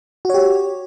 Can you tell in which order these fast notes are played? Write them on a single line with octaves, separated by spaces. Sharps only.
F#4 C#5 G4